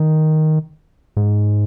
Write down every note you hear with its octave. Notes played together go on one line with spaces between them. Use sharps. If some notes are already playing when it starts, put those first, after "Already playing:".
Already playing: D#3
G#2